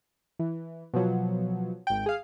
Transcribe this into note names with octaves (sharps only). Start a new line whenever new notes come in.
E3
B2 F3 F#3
G#1 G5
G#4 F5